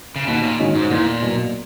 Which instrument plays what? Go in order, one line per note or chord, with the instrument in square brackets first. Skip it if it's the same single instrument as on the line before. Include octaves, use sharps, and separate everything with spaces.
[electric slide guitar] C#3
[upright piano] D#2 [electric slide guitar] B2
[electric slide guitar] A#2
[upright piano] D#3 G#3 C#4 F#4
[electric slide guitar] G#2
[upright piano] E2 [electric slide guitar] A#2
[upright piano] B2 F#3